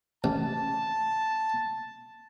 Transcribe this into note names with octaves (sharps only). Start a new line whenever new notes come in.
A1 A5